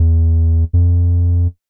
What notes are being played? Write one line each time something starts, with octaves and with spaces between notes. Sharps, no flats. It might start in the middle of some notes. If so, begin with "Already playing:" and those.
Already playing: E2
F2